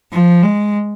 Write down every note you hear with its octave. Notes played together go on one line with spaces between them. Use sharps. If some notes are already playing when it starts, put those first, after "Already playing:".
F3
G#3